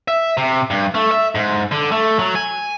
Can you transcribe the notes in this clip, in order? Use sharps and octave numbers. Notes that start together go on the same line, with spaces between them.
E5
C3
G2
A3
E5
G#2
D3
A3
F#3
G#5